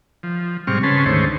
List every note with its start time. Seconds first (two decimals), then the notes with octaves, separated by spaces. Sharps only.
0.23 F3
0.67 G#2 C3 G3 C4 C#6 F6
0.83 C#3 C#4 B4 A5 C6
1.06 D2 G#2 D#3 A3 C5 C#5